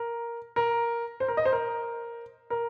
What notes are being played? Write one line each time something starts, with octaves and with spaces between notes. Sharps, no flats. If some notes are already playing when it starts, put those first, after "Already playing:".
Already playing: A#4
A#4
C5
A#4
D#5
C5
A#4
A#4